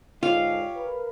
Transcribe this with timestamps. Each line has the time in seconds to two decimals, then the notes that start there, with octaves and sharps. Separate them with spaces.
0.23 G#2 D3 F4 G4 C#5 D#5 F5
0.75 A#4 B4